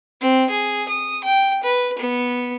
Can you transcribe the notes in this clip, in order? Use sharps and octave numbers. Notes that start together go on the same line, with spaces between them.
C4
G#4
D#6
G5
B4
B3